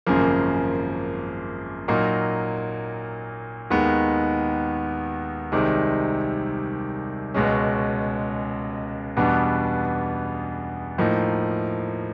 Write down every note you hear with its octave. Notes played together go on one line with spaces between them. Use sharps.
G#1 F#2 C#3 F3 A#3
A#2 F#3 A#3 D#4
D#2 D#3 G#3 B3
C2 C3 D#3 G#3
C#2 B2 G#3 C#4
E2 B2 G3 B3 D4
A2 F3 A#3 D#4